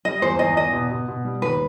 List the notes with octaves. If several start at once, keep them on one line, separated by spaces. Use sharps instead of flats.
G3 D#5
E2 C5
E2 D#5
E2 D#5
B2
B2
B2
G3
D#2 B4